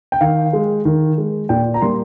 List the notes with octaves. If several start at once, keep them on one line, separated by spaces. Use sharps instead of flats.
G5
D#3 F5
G#3
D#3
G#3
A#2 G5
A#5
G3 A#3 C6